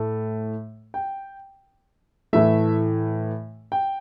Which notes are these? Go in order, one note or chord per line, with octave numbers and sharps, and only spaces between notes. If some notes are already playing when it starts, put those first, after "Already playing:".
Already playing: A2 A3
G5
A2 E3 A3 E5
G5